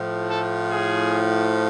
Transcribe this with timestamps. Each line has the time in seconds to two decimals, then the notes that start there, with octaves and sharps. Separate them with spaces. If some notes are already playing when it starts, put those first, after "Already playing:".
Already playing: A2 F3
0.29 A4
0.70 G#4